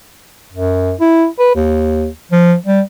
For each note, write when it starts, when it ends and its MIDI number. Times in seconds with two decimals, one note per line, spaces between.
0.52 0.94 42
1.00 1.26 64
1.39 1.51 71
1.55 2.09 39
2.31 2.55 53
2.66 2.81 55